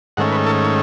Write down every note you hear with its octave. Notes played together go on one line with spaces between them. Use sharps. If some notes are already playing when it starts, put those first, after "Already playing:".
G#2 D#3 A3 C#4 F#5
B4
A4